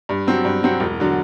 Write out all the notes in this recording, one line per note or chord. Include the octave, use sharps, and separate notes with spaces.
G2
F#3 C4 F#4
G2
F#3 C4 F#4
E1
D3 F#3